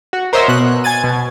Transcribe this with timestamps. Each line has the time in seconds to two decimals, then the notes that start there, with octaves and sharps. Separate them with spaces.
0.13 F#4
0.33 A#4 C5 C#5 D#5 E5
0.48 B2 F#6
0.84 G#5 G#6 A6 D#7
1.04 B2